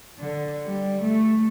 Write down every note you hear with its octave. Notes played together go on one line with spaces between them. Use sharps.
D3
G3
A3